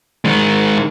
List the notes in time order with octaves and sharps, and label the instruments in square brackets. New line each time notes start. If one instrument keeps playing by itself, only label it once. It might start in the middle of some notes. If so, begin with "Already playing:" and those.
[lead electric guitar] D#3 G#3